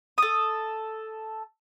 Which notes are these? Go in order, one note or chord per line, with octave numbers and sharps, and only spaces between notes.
A4 D#6